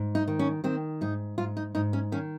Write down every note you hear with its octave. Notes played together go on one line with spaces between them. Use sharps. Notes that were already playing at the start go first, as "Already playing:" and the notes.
Already playing: G#2
D#4
D#3
C#4
D#3 C4
G#2 D#4
G#2 F4
D#4
G#2 D#4
C#4
D#3 C#4